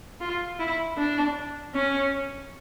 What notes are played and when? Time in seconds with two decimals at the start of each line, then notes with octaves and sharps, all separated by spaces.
0.21 F4
0.59 E4
0.97 D4
1.74 C#4